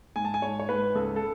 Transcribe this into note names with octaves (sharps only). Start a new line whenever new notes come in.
G#2 G#5
A5
G#5
G#2 C#5
C#5
G#2 B4
C#2 A4
A4